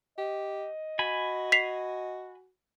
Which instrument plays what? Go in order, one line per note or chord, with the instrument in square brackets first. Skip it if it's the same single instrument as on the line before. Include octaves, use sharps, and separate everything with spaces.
[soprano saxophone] G4 [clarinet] D#5
[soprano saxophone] F#4 [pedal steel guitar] G#5 B5
[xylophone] B6 C7 F7